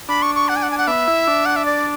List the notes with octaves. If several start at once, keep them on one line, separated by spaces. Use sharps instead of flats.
D4 B5
C#6
C#6
F#5
G#5
F#5
G#5
F#5
B3 E5
E4
D4
F#5
E5
D5